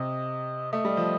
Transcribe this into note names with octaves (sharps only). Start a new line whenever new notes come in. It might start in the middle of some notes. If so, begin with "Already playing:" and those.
Already playing: C3 D#5
A3 D#5
G3
F3